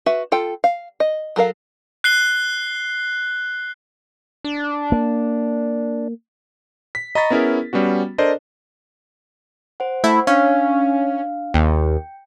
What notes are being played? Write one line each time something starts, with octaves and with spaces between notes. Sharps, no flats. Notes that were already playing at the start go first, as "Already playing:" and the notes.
F#4 B4 E5
F4 A4 G5
F5
D#5
F#3 A4 A#4 F5
F#6 C7 G7
D4
A#3
B6
D#5 A#5 B5 C#6 A6 B6
B3 C#4 E4 G#4 A#4
G3 B3 C#4 F#4
D4 A4 A#4 C5 D5 D#5
C5 F#5
A3 E4
C#4 D4 F5
D#2 G5